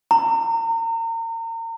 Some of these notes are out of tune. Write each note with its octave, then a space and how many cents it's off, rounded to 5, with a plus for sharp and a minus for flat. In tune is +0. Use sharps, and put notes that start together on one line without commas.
A#5 -35